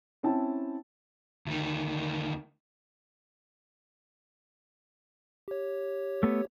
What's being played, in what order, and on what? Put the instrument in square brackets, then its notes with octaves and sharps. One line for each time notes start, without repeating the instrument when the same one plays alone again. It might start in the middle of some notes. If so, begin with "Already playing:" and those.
[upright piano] C4 C#4 E4 G5 A5
[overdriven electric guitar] D2 D#3
[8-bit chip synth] G4 C#5
[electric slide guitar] A3 B3